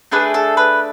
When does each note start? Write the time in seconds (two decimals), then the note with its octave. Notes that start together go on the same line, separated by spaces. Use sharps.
0.12 A3 D4 G#4 B4
0.34 A4
0.57 B4